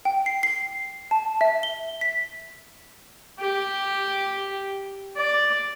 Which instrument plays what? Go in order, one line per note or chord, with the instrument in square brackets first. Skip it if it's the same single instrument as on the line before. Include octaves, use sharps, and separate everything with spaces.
[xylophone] G5
C7
C7
A5
E5
G7
B6
[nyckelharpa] G4
D5